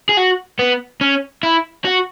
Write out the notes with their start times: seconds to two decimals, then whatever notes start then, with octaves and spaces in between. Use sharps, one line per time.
0.09 G#4
0.17 F#4
0.59 B3
1.01 C#4
1.43 E4
1.85 F#4